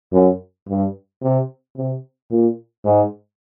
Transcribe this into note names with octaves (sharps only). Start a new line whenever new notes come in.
F#2
G2
C3
C3
A#2
G#2